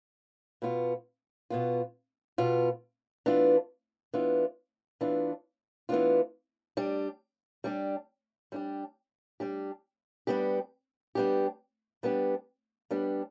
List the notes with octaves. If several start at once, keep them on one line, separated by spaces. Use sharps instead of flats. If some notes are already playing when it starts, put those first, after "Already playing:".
B2 B3 F4
B2 B3 F4
B2 B3 F4
E3 B3 D4 F4
E3 B3 D4 F4
E3 B3 D4 F4
E3 B3 D4 F4
G3 D4 G4
G3 D4 G4
G3 D4 G4
G3 D4 G4
G3 B3 D4 G4
G3 B3 D4 G4
G3 B3 D4 G4
G3 B3 D4 G4